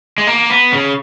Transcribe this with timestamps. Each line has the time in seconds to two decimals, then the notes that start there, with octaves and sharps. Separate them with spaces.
0.18 G#3
0.27 A#3
0.50 B3
0.73 C#3